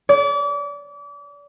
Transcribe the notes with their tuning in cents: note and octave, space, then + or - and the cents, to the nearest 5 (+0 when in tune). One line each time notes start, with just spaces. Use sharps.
D5 -35